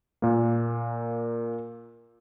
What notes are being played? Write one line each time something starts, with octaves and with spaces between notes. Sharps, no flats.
A#2 A#3